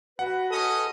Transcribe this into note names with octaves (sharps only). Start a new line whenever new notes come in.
F#4 B4 F#5
C#4 A4 D#5 D#6